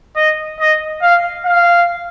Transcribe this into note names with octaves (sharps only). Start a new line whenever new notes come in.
D#5
D#5
F5
F5